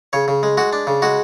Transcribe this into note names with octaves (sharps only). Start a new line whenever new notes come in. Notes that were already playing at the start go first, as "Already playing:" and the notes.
C#3 C#5
C#3
G#3
G#3 F#4
D4
C#3
G#3 F#4